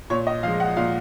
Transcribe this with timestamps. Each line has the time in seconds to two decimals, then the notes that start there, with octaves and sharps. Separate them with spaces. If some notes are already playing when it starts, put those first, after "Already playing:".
0.10 A#2 C#5
0.27 D#5
0.43 F3 G#3 F5
0.60 F#5
0.77 A#2 F5